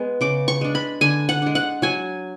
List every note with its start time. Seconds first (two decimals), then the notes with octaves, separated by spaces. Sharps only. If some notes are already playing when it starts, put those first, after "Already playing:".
Already playing: G#3 B3
0.21 C#3 D6
0.48 C#6
0.61 G#3 D4
0.75 B5
1.01 D3 G#5
1.29 F#5
1.42 G#3 D4
1.55 F#5
1.82 F#3 G#5